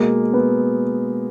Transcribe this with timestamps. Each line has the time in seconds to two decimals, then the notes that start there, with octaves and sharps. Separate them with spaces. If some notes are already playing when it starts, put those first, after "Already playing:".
Already playing: B2 G#3 A#3
0.33 B3